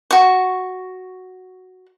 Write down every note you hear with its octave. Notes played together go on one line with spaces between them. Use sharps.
F#4 C#6